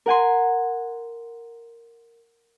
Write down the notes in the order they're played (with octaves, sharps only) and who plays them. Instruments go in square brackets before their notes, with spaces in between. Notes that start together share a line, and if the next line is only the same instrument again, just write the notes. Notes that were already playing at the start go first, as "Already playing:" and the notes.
[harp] A#4 F#5 G#5 C6